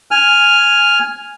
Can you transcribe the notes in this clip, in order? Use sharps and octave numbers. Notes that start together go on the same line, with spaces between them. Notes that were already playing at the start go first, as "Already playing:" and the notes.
G#5 F6